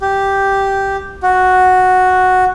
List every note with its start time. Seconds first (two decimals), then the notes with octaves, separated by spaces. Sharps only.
0.01 G4
1.23 F#4